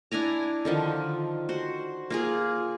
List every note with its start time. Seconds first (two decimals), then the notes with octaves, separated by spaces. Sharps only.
0.12 D4 E4 G#5 A#5
0.65 D3 D#3 F3
1.49 F#4 C5
2.10 A#3 F4 G#4